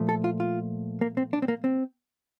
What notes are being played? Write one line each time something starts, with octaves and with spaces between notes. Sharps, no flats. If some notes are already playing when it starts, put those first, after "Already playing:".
Already playing: A#2 F3 A3
A4
F4
F4
A#3
C4
D4
C4
A#3
C4